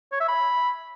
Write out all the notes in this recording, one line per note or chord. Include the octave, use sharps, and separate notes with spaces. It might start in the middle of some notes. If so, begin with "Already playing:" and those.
C#5
E5
B5